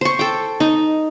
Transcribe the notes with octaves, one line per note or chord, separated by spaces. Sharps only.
C5 C#6
A4 G5
D#4